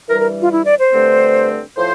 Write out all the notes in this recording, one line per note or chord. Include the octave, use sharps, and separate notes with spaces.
G2 E3 G3 A#4
A#4
F4
E4
D5
C5
G2 D3 A3 C4
A2 F3 C5